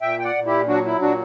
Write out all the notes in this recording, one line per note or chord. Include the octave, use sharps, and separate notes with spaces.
A#2 E5 G5
G5
D5 F#5
A#2
E4 G4
F#3 D4 F#4
E4
A#2 D4 F#4